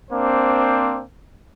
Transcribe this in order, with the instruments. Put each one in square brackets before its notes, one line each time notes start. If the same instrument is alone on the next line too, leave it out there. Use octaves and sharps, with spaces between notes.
[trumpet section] A#3 C4 D4 C5